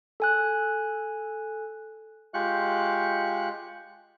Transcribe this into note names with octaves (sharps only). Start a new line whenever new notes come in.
A4 G#5 F#6
G#3 F4 G4 C#6 F#6